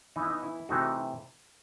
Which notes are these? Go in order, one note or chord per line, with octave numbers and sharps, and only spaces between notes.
E3 B3 D#4
E4
D#4
E4
C3 E3 A3 C4 D#4 F#4